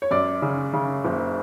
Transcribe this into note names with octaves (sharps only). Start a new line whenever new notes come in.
C#5
F#2 D5
C#3
C#3
F#1